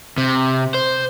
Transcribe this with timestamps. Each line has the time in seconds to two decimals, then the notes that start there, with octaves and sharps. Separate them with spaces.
0.18 C3
0.74 C5